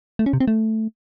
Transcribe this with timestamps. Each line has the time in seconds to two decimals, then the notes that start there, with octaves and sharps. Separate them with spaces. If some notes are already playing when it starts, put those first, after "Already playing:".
0.19 A3
0.26 C#4
0.33 C3
0.40 C4
0.48 A3